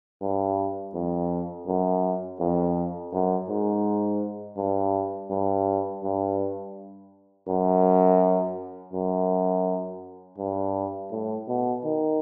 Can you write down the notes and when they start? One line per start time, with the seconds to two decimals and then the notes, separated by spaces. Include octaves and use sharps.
0.21 G2
0.94 F2
1.67 F#2
2.40 F2
3.12 F#2
3.49 G#2
4.57 G2
5.30 G2
6.03 G2
7.48 F#2
8.93 F#2
10.38 G2
11.11 A2
11.48 B2
11.84 D#3